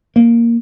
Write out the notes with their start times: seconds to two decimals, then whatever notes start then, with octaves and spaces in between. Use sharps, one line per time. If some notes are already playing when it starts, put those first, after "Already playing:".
0.16 A#3